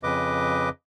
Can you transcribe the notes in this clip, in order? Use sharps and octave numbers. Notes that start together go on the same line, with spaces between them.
F2 C#3 B4 D#5 D6